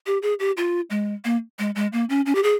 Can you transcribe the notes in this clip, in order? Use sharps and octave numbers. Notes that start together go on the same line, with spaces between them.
G4
G#4
G4
F4
G#3
A#3
G#3
G#3
A#3
C#4
C#4
G4
G#4